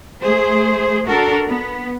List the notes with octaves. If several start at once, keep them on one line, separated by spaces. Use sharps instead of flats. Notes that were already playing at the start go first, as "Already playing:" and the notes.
A3 G#4 C5
D4 F#4 A4 A#4
B3